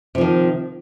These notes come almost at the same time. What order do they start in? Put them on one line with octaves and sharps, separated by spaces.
C3 F3 D#3